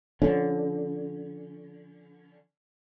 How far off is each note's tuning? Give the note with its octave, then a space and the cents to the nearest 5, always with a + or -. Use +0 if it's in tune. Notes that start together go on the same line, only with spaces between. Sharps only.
D3 -20 F3 +0 C#4 +0